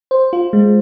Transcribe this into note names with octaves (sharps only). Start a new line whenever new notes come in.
C5
F4
G#3